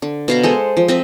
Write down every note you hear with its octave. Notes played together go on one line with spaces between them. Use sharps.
D3
B2 F5 A#5
G#3 A4 C5
F3
C4 D#5 E5